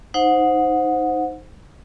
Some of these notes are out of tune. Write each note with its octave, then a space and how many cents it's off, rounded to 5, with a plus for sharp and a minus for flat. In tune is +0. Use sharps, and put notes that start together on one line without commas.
D#4 +0 C5 +0 F#5 -25